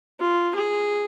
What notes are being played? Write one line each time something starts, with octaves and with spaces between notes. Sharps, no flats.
F4
G#4